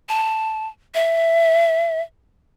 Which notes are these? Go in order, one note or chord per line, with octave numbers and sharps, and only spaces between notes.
A5
E5